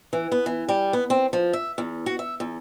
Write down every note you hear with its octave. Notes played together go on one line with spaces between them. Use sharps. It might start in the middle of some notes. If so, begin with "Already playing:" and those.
E3
B3
E3
G3
B3
C4
F3
E5
E2
F#4
E5
E2